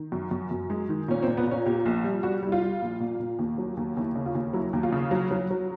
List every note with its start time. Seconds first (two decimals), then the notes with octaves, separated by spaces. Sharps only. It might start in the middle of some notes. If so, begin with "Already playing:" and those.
Already playing: D#3
0.12 F#2
0.31 F#2
0.51 F#2
0.70 G#3
0.89 D#3
1.08 A#2 C#4
1.23 C4
1.28 A#2
1.37 B3
1.47 A#2 C#4
1.66 A#2 G4
1.86 A#1
2.04 G3
2.23 G3 F#4
2.43 G3 E4
2.52 F4
2.62 G3
2.82 A#1
3.00 A#2
3.20 A#2
3.39 D#2
3.58 F#3
3.77 D#2
3.97 D#2 E4
4.16 C#3
4.26 F4
4.35 D#2
4.53 F#3 E4
4.73 D#2
4.83 F4
4.92 C#3
5.11 F#3
5.31 F#3
5.51 F#3